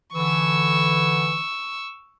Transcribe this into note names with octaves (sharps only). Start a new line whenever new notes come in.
D3 E3 C#6 E6